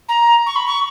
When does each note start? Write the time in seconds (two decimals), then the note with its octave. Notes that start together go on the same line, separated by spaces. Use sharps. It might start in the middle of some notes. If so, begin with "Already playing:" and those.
0.09 A#5
0.46 C#6
0.56 B5
0.66 C#6